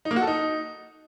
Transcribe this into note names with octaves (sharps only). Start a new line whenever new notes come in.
D#4
A#3
F#4
A4
D#4